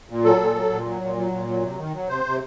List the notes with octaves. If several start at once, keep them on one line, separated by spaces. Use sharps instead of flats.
A#2
F#3 A4
A#2
F#3
A#2
F#3
A#2
F#3
A#2
F#3
C3
D#3
F#3
C3 C5
C3